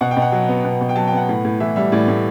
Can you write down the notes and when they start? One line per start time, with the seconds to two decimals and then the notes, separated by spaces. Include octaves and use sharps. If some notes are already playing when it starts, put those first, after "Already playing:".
0.01 B2 F#5
0.11 G5
0.17 B2
0.22 F#5
0.32 F#3
0.49 B3
0.65 B2
0.81 B2
0.89 G5
0.96 F#3 A5
1.07 G5
1.12 B3 F#5
1.29 A2
1.45 A2
1.60 E3 E5
1.76 G3 E5
1.92 A2 D5
2.08 A2